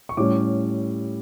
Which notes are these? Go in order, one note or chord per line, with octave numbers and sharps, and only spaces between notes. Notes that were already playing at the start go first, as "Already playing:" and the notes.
C#6
A2 G3 C#4 D6